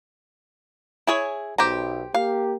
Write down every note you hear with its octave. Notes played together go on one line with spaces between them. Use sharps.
E4 G#4 C#5
B1 G4 C5 A#5
A#3 G4 F5